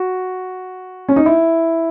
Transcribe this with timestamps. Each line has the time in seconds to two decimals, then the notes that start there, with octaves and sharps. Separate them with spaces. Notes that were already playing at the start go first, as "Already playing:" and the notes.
Already playing: F#4
1.09 C#4
1.16 D#4
1.26 E4